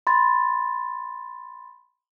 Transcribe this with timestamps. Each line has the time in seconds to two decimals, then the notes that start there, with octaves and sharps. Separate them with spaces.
0.07 B5 C6 A6